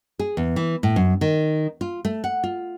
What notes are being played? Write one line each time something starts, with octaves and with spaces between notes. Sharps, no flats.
G#4
E2
E3
A2
F#2
D#3
F4
A3
F#5
F4